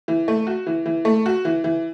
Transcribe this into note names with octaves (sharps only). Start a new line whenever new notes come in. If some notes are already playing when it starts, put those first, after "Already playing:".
E3
A3
F#4
E3
E3
A3
F#4
E3
E3